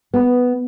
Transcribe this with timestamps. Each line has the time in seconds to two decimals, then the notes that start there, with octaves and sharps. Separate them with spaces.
0.14 B3